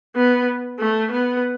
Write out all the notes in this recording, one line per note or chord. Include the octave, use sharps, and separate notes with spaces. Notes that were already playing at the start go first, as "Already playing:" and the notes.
B3
A3
B3